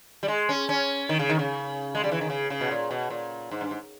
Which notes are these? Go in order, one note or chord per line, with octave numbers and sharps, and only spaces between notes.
G3
G#3
C#4
C#4
D#3
C#3
D#3
C#3
G#3
G3
E3
D#3
C#3
C#3
B2
A#2
B2
A#2
G#2
G2
G#2